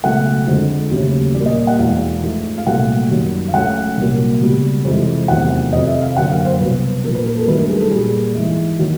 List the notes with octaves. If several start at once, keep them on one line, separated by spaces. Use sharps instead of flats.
C#2 B2 F#3 A3 F#5
F2 D3 F3 G#3
D#2 C#3 F#3 A3
A#2 G3 A#3 D5
D#5
F#5
E2 B2 G#3 F5
G#2 F3 A3
F5
C2 A#2 F#3 A3 F#5
F#2 D#3 G3
F5
C#2 C#3 F#3 A3 F#5
C2 A#2 F#3 A#3
C#2 B2 G3
F2 C3 E3 G#3
E2 C3 D#3 F#3 A3 F#5
F2 C3 D#3 D#5
E5
F5
F#2 D3 F#3 A#3 F#5
F5
C5
C2 B2 F#3 B4
A#2 F3 A#3 A#4
B4
A#4
A4
A#4
G2 D#3 F#3 A3 B4
A#4
G#4
A4
A#2 G3 A#3 G#4
G#2 E3 G#3
D#3 F#3 A#3